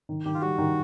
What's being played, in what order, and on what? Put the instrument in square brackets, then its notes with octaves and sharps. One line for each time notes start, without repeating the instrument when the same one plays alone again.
[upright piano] D#3
[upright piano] D#3 [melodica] G4
[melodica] F4
[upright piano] G3 [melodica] F#4
[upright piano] D#3